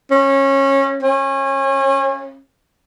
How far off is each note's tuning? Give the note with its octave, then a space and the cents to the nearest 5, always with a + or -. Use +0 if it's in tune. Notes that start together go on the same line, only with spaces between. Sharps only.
C#4 -20
C#4 -30